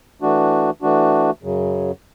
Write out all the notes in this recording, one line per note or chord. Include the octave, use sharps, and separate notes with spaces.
E3 A3 D4 F#4
E3 A3 D4 F#4
F#2 C#3 F#3